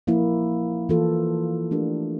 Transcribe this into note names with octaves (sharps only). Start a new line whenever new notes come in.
F3 A#3 E4
E3 A#3 F4 A4
A3 D4 G4 A#4